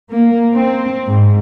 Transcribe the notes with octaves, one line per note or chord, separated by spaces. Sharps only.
A#3
C4
G#2